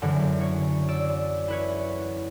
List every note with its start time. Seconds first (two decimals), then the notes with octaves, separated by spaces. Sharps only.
0.02 F#2 D3 E3
0.41 C#5
0.88 D5 E6
1.48 E4 B4 C#5